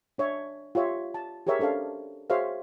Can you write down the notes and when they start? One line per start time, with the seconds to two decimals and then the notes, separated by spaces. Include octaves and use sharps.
0.18 D4 C#5 E5
0.75 F4 G4 C#5 E5
1.14 A5
1.47 G4 G#4 A#4 C#5 E5
1.59 C#4 D4 A4 C5 F5
2.30 F#4 G#4 C5 C#5 E5 F5